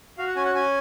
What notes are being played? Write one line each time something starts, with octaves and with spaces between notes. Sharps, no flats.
F#4 F5
F#5
C#4 G#5
F#5
C#4 G#5